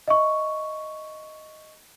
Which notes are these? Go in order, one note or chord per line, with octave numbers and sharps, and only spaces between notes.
D#5 E5 C#6